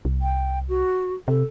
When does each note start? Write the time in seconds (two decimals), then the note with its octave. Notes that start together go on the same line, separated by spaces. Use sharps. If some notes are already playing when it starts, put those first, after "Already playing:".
0.05 C2
0.22 G5
0.69 F#4
1.28 C3 A4